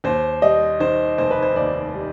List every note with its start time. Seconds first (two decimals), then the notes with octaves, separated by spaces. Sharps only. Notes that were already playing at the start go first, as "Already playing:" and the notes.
0.04 D#2 C5
0.42 G3 D#5
0.80 D#3 C5
1.18 F1 C5
1.31 B4
1.43 C5
1.56 D#2 D5
1.94 G3